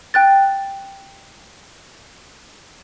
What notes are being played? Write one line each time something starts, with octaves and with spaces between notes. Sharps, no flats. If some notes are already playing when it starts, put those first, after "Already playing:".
G5 F#6 A6